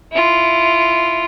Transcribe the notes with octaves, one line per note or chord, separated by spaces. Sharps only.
E4 F4